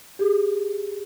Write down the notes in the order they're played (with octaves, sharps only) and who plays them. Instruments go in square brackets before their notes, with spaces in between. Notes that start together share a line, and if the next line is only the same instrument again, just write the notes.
[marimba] G4 G#4